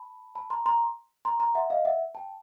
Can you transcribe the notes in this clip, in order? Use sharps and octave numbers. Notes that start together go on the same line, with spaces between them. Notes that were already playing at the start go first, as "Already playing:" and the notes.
Already playing: A5 B5
A5 B5
A#5 C6
A#5 C6
A#5 C6
A#5 C6
E5 F#5
D#5 F5
E5 F#5
G5 A5